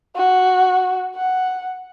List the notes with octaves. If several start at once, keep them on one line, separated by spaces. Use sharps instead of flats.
F#4
F#5